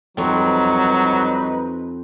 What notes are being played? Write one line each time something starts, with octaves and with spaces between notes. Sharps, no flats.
F2 F#3 G3 C4 D#4 B4